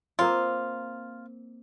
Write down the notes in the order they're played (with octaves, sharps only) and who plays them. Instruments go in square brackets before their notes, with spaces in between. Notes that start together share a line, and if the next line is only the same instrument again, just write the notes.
[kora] A#3 C4 [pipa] F4